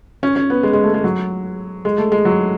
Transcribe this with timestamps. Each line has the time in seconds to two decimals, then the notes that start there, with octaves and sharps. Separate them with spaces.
0.23 C#4
0.36 C#4
0.50 B3
0.63 G#3
0.73 G#3
0.84 A3
0.94 G#3
1.04 F#3
1.85 G#3
1.98 A3
2.12 G#3
2.25 F#3